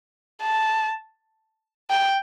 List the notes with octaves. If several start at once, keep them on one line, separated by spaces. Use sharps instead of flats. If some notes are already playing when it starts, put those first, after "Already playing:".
A5
G5